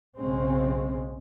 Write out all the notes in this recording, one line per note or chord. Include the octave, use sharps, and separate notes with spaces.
B1 G#2 C#3 G#3 C4 C#4